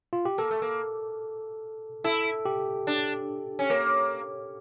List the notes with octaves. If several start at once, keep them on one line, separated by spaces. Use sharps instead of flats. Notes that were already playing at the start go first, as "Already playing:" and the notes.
F4
G4
A#3 A4
A3
A#3
E4 A4
G4
D4
C#4
A#3